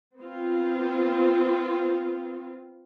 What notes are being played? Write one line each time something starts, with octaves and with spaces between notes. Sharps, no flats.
B3 C4 F4